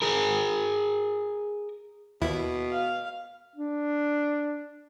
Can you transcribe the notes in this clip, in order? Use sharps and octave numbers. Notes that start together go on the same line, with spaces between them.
G#4 A#4
D#2 B2 E4
F5
D4